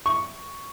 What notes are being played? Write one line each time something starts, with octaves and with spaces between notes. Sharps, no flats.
C#6